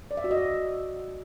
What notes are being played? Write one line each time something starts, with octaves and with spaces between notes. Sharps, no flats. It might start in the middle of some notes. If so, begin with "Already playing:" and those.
D5
E5
F#4
D#5
E5